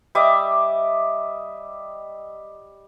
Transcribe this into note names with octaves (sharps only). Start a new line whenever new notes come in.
G3 D#5 E5 D6